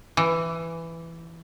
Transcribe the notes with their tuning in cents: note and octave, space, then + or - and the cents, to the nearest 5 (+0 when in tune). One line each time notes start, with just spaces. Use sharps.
E3 +10